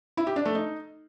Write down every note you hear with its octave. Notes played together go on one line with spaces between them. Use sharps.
E4
G4
D4
A3
D#4